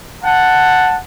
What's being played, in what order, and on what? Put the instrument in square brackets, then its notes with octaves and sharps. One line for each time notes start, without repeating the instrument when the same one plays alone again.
[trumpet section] F#5 A5